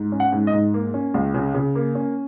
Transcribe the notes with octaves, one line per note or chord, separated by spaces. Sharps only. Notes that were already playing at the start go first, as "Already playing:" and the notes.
Already playing: G#2
C#4
F#5
G#2
D#5
G#2
A#3
C#4
C#2
C#3
C#3
A#3
C#4